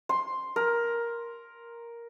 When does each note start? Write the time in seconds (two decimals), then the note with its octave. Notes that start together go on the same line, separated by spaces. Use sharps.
0.09 C6
0.56 A#4